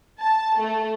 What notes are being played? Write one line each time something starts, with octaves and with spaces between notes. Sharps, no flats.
A5
A3